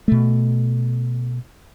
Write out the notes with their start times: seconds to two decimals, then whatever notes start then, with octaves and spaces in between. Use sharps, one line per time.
0.08 B2 A3